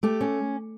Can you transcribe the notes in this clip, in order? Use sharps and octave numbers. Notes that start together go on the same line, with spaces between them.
A3 G4
C#4